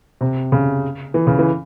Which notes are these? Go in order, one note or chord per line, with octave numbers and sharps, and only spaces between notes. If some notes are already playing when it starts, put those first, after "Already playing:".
C3
C#3
E3
C#3
E3